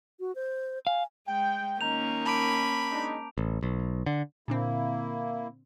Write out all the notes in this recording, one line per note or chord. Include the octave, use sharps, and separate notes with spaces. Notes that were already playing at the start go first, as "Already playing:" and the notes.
F#4
C5
F5 G#5
G#3 G5
D#3 A#3 C#4 D#4 A#5 G6 F7
A5 B5 D6 D7
G#3 D4 D#4
A1
B1
D3
A#2 D3 A#3 C4 E4